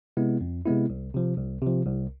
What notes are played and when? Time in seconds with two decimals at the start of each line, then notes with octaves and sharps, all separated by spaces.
0.17 C3 G#3 B3 E4
0.41 F2
0.65 C3 G#3 B3 E4
0.90 C2
1.14 C3 F3
1.38 C2
1.62 C3 F3
1.86 C2